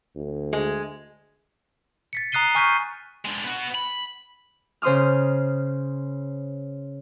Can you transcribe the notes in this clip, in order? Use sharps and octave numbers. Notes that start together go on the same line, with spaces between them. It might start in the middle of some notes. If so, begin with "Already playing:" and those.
D2
G#3
A6 B6 C#7
A#5 D#6 F#6 C7 D#7 G7
G#5 C#6 F6 G6 B6 D#7
G#3 D4
B3 F#4
B5
C#3 C5 C6 D#6 F6